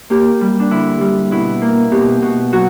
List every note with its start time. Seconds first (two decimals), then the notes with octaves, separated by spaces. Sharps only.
0.10 A#3 G4
0.41 G3
0.60 D4
0.71 D3 E4
1.01 G3
1.31 B2 E4
1.62 A#3
1.92 B2 G4
2.22 B2
2.52 F#3 F#4